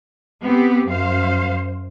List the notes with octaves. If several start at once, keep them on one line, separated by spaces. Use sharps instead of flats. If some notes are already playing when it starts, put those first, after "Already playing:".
B3 C4 G4
F#2 C5 F5